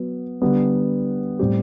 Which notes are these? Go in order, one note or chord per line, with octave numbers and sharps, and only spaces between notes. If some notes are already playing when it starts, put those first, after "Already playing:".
Already playing: F#3 B3
D3 G3 B3
A2 G3 C4 G4